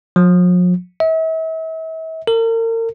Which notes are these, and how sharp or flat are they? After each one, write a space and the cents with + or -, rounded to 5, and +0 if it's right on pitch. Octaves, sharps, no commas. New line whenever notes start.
F3 +45
E5 -40
A#4 -40